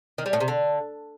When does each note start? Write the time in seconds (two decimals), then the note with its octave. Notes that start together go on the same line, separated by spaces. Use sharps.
0.18 D#3
0.26 G3
0.33 A2
0.40 C3
0.48 D3